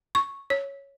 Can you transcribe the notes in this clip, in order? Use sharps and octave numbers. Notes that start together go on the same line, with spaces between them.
C#6
C#5